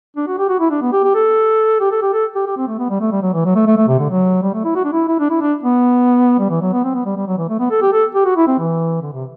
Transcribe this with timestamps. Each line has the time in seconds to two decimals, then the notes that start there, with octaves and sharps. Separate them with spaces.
0.16 D4
0.27 F#4
0.38 G4
0.49 F#4
0.60 E4
0.71 D4
0.81 B3
0.92 G4
1.04 G4
1.15 A4
1.80 G4
1.91 A4
2.02 G4
2.13 A4
2.35 G4
2.46 G4
2.57 C4
2.68 A3
2.79 B3
2.90 G3
3.01 A3
3.11 G3
3.22 F#3
3.34 E3
3.45 F#3
3.55 A3
3.66 A3
3.77 A3
3.88 C3
3.99 D3
4.10 F#3
4.43 G3
4.54 A3
4.65 E4
4.76 F#4
4.85 D4
4.92 E4
5.08 E4
5.19 D4
5.30 E4
5.41 D4
5.63 B3
6.39 G3
6.50 E3
6.62 F#3
6.73 B3
6.84 C4
6.95 B3
7.06 G3
7.16 G3
7.27 F#3
7.38 E3
7.49 A3
7.60 B3
7.71 A4
7.82 G4
7.93 A4
8.15 G4
8.25 F#4
8.36 E4
8.47 C4
8.59 E3
9.02 D3
9.13 C3